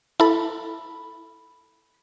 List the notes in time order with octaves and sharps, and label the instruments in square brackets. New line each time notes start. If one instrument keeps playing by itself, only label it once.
[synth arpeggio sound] E4 A4 [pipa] B5